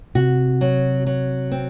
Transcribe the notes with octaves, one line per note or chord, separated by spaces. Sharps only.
C3 F#4
F#3
F#3
C4